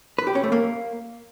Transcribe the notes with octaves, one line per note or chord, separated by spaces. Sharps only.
B4
G4
C#4
A3
A#3